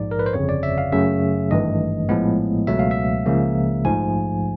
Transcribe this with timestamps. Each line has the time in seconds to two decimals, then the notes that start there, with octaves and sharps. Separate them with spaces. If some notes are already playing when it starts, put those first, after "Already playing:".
Already playing: A#1 G#2 F3 D5
0.11 A#4
0.19 B4
0.26 C5
0.34 G1 F2 C#3 C#5
0.49 D5
0.63 E5
0.78 F5
0.92 F#2 C#3 F#3 A3 E5
1.51 G#1 G2 E3 A3 D#5
2.09 A#1 A2 F3 G#3 B3
2.67 C#2 B2 F#3 A3 E5
2.79 F5
2.91 E5
3.26 C#2 C#3 F3 A#3
3.85 A#1 G#2 F3 A3 G#5